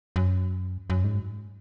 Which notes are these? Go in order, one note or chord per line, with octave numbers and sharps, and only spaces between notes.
F#2
F#2
G#2